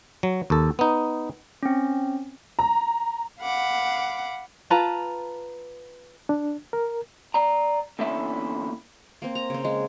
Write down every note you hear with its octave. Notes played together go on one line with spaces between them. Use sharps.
F#3
D#2 A4
B3 D#4
C4 C#4
A#5
F5 F#5 B5 D6
F4 B4 A5 A#5
D4
A#4
D5 A#5
E2 D3 A#3 C#4 E4 E5
A#3 C4
A#5
C#3 C4
G#3